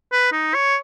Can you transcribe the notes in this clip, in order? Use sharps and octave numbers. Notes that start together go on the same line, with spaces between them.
B4
D#4
C#5